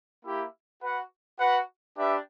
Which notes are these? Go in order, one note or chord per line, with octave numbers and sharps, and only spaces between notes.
A#3 E4 G4
F#4 B4 F#5
F#4 B4 F#5
D4 G4 B4 E5